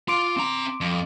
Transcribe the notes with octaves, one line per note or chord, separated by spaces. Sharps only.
F4 C6 D6 D7
C4 A#5
F2